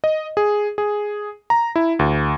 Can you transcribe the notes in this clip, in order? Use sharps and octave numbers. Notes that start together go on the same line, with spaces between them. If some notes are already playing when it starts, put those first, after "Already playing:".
D#5
G#4
G#4
A#5
E4
D2